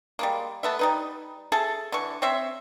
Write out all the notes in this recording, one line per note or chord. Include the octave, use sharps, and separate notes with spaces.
G3 G#3 A#3
A3 B3 E5
G3 D#4 B4
G#4 A4 E5 A5
D3 E3 C#6
C4 C5 C#5 E5